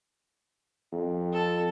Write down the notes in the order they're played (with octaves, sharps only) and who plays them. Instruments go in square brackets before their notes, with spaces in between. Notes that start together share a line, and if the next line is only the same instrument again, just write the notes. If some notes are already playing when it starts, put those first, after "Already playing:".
[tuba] F2
[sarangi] A4